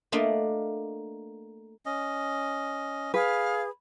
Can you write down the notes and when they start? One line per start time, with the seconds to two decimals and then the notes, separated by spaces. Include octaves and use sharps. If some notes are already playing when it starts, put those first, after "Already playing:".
0.12 A3 A#3 D4 F4 D#5
1.86 C#4 D#5
3.14 G#4 B4 F5